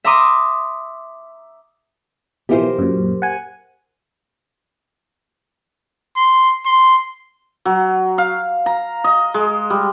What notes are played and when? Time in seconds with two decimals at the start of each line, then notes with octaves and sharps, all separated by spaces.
0.05 E5 A#5 C6 D6 D#6
2.49 B2 E3 F3 G4 A#4 C5
2.79 F#2 A#2
3.22 F#5 G#5
6.16 C6
6.66 C6
7.65 F#3
8.18 F5
8.66 A#5
9.04 D#5
9.34 G#3
9.70 G3